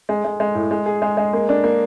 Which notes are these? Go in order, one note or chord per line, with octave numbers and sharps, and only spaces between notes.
G#3
G#3
G#3
A2
G#3
G#4
G#3
G#3
A#3
D4
A#3